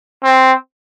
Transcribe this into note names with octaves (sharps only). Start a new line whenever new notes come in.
C4